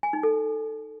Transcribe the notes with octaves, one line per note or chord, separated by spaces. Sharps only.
G#5
D#4
A4